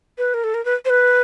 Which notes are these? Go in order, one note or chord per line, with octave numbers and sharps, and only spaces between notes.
B4
A#4
A4
A#4
B4
C5
B4